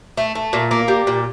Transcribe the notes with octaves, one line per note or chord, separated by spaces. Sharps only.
A3
A3
A#2
A#3
G3
A#2